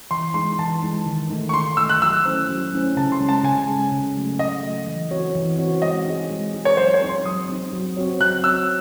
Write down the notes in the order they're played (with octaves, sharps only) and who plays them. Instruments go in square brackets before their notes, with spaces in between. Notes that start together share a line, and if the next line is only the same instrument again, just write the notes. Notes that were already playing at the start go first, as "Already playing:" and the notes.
[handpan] E3 [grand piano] C6
[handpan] G#3 D#4 [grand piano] C6
[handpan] E3 [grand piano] A5
[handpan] G#3 D#4
D#3
A3 D#4
[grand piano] C#6
[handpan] D#3 [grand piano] C6
[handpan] A3 D#4 [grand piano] E6
[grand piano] F#6
[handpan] F#3 [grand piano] E6
[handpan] A3 C#4 E4 C5
F#3
A3 C#4 E4 C5
[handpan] C#3 [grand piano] A5
[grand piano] C6
[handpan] G#3 C#4
[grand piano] A5
[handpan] C#3 [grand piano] G#5
[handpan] G#3 C#4
C#3
F#3 A3
[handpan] C#3 [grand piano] D#5
[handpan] F#3 A3
E3
C4 F#4 C#5
E3
C4 F#4 C#5
[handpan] G#3 [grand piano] D#5
[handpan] D#4 G#4
G#3
D#4 G#4
[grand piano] C#5
[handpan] F#3 [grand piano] C5
[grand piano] C#5
[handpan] C4 D#4
[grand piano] C6
[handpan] F#3 [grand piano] D#6
[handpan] C4 D#4
F#3
C4 F#4 C#5
[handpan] F#3 [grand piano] F#6
[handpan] C4 F#4 C#5 [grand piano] E6